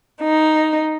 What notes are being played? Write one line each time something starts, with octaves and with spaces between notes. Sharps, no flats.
D#4